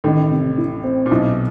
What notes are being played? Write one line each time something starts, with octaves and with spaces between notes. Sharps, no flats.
A1 A2 D#3
C3
E4
C4
A#2
B1 B2 E4